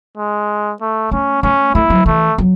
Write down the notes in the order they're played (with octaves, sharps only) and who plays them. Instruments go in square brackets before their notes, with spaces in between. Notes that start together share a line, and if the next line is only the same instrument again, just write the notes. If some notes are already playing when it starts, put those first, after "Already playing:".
[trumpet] G#3
A3
[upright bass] A3 [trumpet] C#4
[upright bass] A3 [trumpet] C#4
[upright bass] A3 [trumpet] E4
[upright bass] F#3
[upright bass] E3 [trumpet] A3
[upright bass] F#3